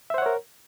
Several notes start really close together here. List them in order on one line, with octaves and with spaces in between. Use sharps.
E5 C5 F#5 C#5 A#4